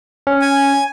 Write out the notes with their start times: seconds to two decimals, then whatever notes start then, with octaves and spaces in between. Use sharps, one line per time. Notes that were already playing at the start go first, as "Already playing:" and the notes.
0.27 C#4
0.41 G#5